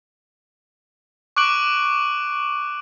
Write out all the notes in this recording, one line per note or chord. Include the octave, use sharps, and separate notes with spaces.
C#6 D6 F#6 D7 F#7